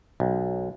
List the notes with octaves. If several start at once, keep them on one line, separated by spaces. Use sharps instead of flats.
B1